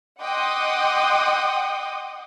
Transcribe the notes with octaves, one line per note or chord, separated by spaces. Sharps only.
D#5 F#5 G5 C6 D6 D#6